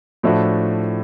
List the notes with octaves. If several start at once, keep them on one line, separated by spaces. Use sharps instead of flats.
A2 F3 A3 D4 F#4